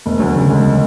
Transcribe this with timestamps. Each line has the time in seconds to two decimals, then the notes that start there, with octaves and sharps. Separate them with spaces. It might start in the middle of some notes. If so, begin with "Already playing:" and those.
0.06 E1 A3
0.20 D2 F#3
0.36 C#3 F#3
0.50 D3 G#3